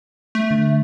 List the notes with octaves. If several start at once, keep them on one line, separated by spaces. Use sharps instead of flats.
A3
D3